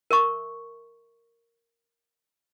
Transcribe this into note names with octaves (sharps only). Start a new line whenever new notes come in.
A#4 E5 C#6